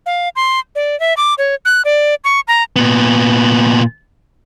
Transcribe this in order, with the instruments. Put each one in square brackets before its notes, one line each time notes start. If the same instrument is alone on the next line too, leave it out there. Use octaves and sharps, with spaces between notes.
[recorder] F5
C6
D5
E5
D6
C#5
F#6
D5
C#6
A#5
[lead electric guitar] A#2 B3